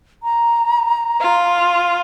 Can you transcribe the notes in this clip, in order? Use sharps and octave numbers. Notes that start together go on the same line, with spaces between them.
A#5
F4